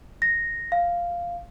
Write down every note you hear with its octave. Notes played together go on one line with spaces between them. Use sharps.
A#6
F5